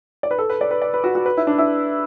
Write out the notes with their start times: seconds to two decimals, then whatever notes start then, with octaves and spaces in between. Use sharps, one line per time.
0.23 D5
0.31 B4
0.38 A4
0.50 B4
0.61 D5
0.71 B4
0.82 D5
0.94 B4
1.04 F#4
1.15 F#4
1.26 B4
1.37 E4
1.47 D4
1.58 E4